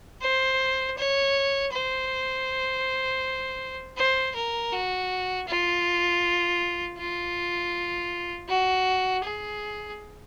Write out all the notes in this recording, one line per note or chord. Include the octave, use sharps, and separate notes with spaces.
C5
C#5
C5
C5
A#4
F#4
F4
F4
F#4
G#4